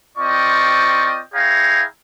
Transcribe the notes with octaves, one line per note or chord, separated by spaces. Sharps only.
C4 F4 D5 D#5 G5 C#6
E4 G#4 C#5 F5 G5 A#5